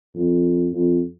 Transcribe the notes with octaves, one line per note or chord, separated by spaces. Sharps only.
F2
F2